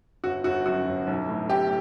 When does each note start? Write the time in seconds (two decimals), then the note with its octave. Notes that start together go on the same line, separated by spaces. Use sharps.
0.24 G1 F#4
0.44 G1 F#4
0.66 F#2 F#4
0.87 G1
1.07 B1
1.29 A2
1.49 A2 G4